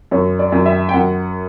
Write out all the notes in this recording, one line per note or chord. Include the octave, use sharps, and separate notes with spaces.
F#2 C#5
D5
F#2
E5
G5
F#2 F#5